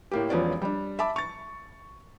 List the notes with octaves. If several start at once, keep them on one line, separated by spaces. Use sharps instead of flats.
A2 A#3 G4
E1 F3 B3 C#4 D5
G3 D4
E5 A5 B5 D6
C#6 A6